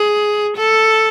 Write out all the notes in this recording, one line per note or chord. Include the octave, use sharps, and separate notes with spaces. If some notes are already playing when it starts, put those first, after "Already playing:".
Already playing: G#4
A4